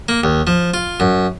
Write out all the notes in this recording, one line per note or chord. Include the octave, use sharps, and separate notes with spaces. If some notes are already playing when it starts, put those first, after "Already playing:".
A#3
D#2
F3
F4
F#2